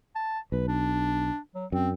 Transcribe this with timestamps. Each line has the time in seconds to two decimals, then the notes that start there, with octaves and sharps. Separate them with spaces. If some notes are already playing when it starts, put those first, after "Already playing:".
0.15 A5
0.52 B1 B4
0.68 D4
1.55 F#3
1.72 F#2 C4